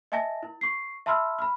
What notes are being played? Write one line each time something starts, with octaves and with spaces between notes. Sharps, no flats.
D#5 E5 G#5 A5 A#6
E4
C#6 C7
E5 A5 B5 C6 E6 F6
B5 F6